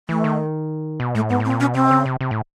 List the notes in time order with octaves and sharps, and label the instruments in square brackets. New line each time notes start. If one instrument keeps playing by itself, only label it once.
[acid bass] E3 [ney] A3
[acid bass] D#3
B2
[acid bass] A2 [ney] A3
[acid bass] G#2 [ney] B3
[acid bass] A2 [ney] C4
[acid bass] A#2
[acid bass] B2 [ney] C#4
[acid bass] C3 [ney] C4
[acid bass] C#3
C3
C3
A2